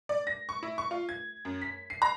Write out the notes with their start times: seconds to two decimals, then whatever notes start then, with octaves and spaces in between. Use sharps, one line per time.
0.09 D5
0.27 A#6
0.49 C#6
0.63 E4
0.78 C#6
0.91 F4
1.09 G#6
1.45 F#2
1.62 B6
1.90 C7
2.02 A#5